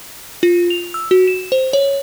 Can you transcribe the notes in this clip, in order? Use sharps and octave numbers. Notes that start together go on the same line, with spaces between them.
F4
F7
E6
F#4
E7
C5
C#5